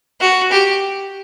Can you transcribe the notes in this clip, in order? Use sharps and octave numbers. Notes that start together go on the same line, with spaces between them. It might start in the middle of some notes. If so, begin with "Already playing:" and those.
F#4
G4